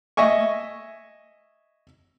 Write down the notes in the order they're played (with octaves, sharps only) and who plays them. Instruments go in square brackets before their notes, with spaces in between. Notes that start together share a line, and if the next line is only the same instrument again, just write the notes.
[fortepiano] D#5 E5 G#5 C#6